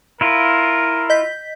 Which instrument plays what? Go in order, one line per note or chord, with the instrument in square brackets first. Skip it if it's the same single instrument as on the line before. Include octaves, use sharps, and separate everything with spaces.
[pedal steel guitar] E4 F4 [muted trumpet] A#4
[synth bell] D#5 G6 B6